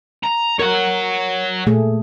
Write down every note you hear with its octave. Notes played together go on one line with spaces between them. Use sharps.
A#5
A#4 C#5 F#5
A#2 A3 G#4